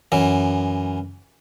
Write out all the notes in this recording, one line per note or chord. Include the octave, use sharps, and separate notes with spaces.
F#2 E3